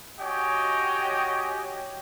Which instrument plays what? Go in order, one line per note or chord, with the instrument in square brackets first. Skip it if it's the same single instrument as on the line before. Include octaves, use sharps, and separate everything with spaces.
[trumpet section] F#4 G4 C#5 D#5 G5 G#5